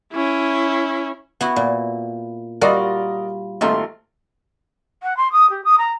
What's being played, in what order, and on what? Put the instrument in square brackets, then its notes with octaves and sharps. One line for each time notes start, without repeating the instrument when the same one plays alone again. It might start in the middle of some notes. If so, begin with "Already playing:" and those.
[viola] C#4 E4
[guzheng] B3 E4 F#4
A#2
[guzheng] G3 F4 F#4 [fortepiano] A#4 D5 D#5
[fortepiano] G#1 A3 C6 [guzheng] A#3 F4 G4
[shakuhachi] F#5
C6
D#6
G4
D#6
A#5